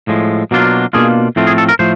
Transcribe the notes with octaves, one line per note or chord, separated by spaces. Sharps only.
A2 F3 G#3
B2 F#3 A#3 D4 F4
B2 F#3 A#3 D4 F4 G#4
A2 F3 A3 C4 F4
G#4
A4
A#4
A2 F3 A3 C5